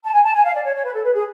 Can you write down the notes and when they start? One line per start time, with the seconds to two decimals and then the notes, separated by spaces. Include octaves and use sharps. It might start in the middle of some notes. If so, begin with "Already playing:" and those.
0.04 A5
0.13 G#5
0.24 A5
0.34 G#5
0.44 F5
0.53 D5
0.63 C#5
0.74 C#5
0.84 B4
0.93 A4
1.04 B4
1.13 G#4